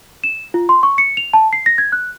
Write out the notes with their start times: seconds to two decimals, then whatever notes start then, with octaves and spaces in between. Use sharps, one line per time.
0.24 E7
0.54 F4
0.69 C6
0.83 C#6
0.98 C#7
1.17 F7
1.33 A5
1.53 C7
1.66 A#6
1.78 G#6
1.92 F#6